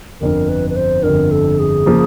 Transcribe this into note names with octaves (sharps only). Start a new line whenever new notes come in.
G1 F2 D3 A#4
B4
B4
C5
G1 F2 D3 A#4
A4
G#4
C#3 F3 A#3